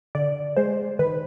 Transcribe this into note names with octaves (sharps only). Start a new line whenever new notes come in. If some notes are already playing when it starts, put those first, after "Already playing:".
D3 D5
G#3 C5
D#3 B4